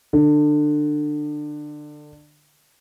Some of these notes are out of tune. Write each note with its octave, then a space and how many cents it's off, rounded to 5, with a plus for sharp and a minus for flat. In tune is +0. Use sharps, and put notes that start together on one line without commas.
D3 +25